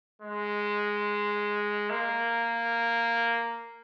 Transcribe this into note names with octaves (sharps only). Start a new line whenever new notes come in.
G#3
A#3